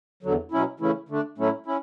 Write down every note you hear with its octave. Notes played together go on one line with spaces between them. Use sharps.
E2 D3 F#3
B2 F#3 C#4 E4
C#3 E3 A3 C#4 E4
D3 A3 D4
A2 F#3 A3 C#4 E4
C#4 E4